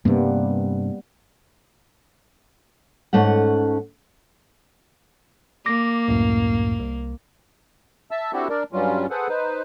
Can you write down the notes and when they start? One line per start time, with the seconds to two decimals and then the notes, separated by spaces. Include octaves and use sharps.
0.05 G2 C3 G3 A#3 B3
3.13 G#2 A3 C#4 F#5
5.66 A#3 D6 A#6
6.08 C#2 F#2 A2
6.79 C2
8.11 E5 A5 E6
8.33 C4 D4 E4 F#4 G4 A4
8.49 D4 A#4 D5
8.73 G2 F#3 G3 C#4 F4
9.10 G#4 A4 B4 C5 F#5
9.29 D#4 B4 C5